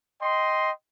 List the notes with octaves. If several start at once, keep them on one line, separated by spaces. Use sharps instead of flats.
D#5 G5 C6